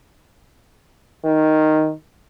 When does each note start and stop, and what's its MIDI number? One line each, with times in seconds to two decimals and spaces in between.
1.25 1.92 51